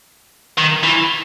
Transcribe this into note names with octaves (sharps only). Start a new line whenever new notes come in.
D#3
E3